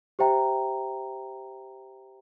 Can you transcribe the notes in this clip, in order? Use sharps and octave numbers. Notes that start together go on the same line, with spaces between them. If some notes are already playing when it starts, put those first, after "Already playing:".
G4 C5 E5 G5 A#5